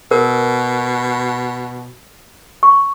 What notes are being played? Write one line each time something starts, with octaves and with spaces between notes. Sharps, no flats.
B2 A#4
C#6